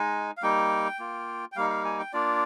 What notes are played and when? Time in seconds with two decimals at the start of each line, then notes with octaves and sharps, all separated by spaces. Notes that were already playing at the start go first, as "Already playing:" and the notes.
Already playing: G#3 D#4 G#5
0.37 F5
0.43 G3 A#3 D#4 G5
0.99 A#3 F4
1.52 G5
1.56 G3 A#3 D#4 F5
1.70 F5
1.85 G#5
1.99 G5
2.13 A#3 D4 F4 D5